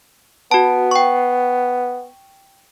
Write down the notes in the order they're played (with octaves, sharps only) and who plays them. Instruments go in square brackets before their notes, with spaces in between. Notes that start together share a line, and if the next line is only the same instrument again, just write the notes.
[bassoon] B3 [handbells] F#4 A5
[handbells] G5 C#6